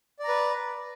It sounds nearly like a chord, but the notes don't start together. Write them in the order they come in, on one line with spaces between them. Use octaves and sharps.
D5 A#5 B4